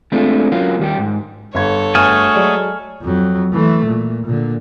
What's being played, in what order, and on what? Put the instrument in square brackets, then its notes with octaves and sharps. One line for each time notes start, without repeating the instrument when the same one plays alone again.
[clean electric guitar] G#3 A3 C4 D4 F4
F#3 A#3 C#4 F4
D#2 G3 G4
G#2
[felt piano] G1 G#6 [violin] A4 C#5
[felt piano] G1 [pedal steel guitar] A3 F#4 G#4 [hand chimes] G#5 F6
[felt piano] F#3 G#3 D5
[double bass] F2 F#3
E3 A3
A#2
A#2 D3